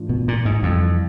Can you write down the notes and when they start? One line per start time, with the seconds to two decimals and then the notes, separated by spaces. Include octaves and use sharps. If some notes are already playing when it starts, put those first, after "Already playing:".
Already playing: G#2 E3 A3 D4 F4
0.09 B2
0.28 A#2
0.45 G#2
0.63 F2 C3 E3 G3 C4 E4